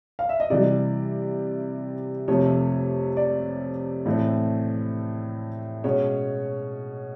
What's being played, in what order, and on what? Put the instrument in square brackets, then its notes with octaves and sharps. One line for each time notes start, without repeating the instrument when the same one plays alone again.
[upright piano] F5
E5
D#5
C3 E3 G3 D5
F2 C3 F3 A3 C#5
D5
A2 E3 A3 C4
B2 G#3 C#4 C#5